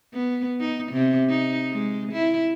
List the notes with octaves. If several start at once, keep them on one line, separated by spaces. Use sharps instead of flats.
B3
D#4
C3
D#4
G#3
E4